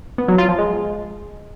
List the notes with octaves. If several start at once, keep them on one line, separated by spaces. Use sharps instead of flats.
B3
F#3
F4
F3
G#3